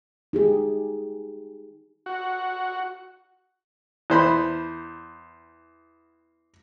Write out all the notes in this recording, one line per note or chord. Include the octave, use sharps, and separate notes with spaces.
D#4 G4 G#4
F#4
E2 C5 B5